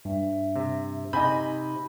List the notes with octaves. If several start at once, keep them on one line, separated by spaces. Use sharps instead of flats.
G2 E5
C3
C3 D#4 D#5 G#5 B5 G6